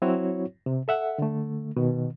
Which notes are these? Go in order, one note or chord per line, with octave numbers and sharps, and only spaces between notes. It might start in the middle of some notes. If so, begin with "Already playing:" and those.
F#3 C4 E4 F#4 C#5
C3
A4 E5 F#5
D3 A3
B2 D#3